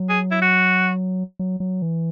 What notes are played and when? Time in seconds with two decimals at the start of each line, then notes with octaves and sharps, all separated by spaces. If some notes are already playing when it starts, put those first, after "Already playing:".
Already playing: F#3
0.09 G#4
0.31 E4
0.42 F#4
1.39 F#3
1.60 F#3
1.82 E3